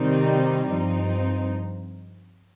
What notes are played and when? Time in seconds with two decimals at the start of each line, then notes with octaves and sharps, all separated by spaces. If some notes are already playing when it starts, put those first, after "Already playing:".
Already playing: C3 D#3 G3 C4 D#4
0.69 G2 F3 C4 D#4